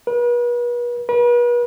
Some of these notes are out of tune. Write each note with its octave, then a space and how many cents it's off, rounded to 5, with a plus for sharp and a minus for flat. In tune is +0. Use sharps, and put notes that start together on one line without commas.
B4 -40
B4 -40